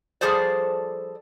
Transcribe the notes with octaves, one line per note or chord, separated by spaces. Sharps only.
F3 G3 G#4 A4 C5 D5